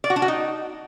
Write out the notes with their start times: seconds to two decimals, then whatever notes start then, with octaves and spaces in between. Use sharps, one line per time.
0.04 D5
0.10 F#4
0.16 D4
0.22 F#4
0.28 D#4